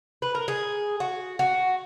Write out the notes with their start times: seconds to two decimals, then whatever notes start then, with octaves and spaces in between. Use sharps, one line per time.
0.22 B4
0.35 A#4
0.48 G#4
1.00 F#4
1.39 F#4